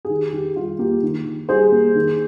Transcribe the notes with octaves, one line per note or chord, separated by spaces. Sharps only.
G#4
D#3 G4
D#3 G4
G3 F4
A#3 G4
D#3
D#3
G3 G#4 C5
A#3
D#3